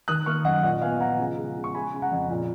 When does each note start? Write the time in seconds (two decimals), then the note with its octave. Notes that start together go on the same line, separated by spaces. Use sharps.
0.08 D#3 D#6 F#6
0.26 A#3 C#6 F6
0.45 F#2 D#5 F#5
0.63 A#2 D#5 F#5
0.82 B3 F5 G#5
1.00 F3 F#5 A#5
1.19 C#3
1.37 G#3
1.57 C#3
1.64 C#6
1.74 G#3 G#5 B5
1.94 C#3 G#5
2.02 F#5 A#5
2.12 F2
2.30 A#2